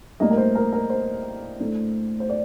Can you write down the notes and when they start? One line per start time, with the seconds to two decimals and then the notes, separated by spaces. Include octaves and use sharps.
0.20 A2 G3 A#3 D4 D#5
0.31 A#4
0.37 C5
0.55 A#4
0.73 A#4
0.90 C5
1.60 A2 A3 D4
2.20 C5
2.29 D5